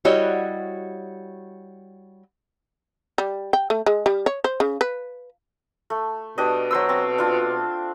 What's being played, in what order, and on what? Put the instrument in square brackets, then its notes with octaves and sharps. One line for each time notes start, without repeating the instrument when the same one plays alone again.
[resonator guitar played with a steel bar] G3 E4 F#4 C#5 D#5
[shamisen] G3
G5
A3
G#3
G3
C#5
C5
C#3
B4
[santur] A3
[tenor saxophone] B2 [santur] D4 G4 D#5
[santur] F#3 C5 E6
C4
D4 F4